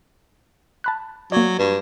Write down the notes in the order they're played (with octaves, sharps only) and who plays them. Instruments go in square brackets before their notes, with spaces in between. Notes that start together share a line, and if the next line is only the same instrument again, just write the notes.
[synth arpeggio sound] A5 B5 F#6
[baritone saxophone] F#3 [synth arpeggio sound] A#3 D5
[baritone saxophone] G2